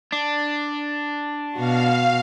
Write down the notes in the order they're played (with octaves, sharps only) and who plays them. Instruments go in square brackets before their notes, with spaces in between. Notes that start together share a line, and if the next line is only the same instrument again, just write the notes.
[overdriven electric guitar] D4
[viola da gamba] B2 F#4 [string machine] F5